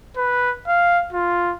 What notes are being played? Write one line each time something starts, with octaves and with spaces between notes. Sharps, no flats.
B4
F5
F4